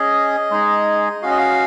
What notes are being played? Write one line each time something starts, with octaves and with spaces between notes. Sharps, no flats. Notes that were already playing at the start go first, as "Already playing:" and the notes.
Already playing: C#4 G#4 D#5
G#3 D#4 G#4
C#4 F#4 F5
D#5
F5